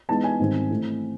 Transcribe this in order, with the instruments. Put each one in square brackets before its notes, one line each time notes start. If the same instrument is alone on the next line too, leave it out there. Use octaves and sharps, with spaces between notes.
[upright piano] E3 G#3 B3 D#4 A5
G#5
G#2 D#3 G3 C4
E3 A3 C4